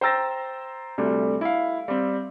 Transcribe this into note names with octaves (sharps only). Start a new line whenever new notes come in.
C5 G5 A#5 E6 A6 A#6
D2 C3 G3 A3
E4 F5
G3 C4